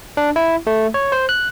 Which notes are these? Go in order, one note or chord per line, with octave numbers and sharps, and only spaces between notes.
D4
E4
A3
C#5
C5
F#6